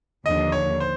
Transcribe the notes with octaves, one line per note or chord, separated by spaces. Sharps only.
D#2 D3 F3 A#3 D4 D#5
C#5
C5